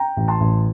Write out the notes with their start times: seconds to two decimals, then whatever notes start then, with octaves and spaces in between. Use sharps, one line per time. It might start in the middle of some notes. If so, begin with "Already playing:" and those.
Already playing: G5 A#5
0.17 A1
0.28 A5 C6
0.40 A1